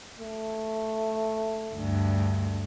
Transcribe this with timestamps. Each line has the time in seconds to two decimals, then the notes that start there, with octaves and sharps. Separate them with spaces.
0.18 A3
1.75 D2 G2